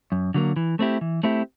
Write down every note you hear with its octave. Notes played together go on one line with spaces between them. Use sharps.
F#2
D3 F#3 A#3
E3
A3 C4 E4 G4
E3
A3 C4 E4 G4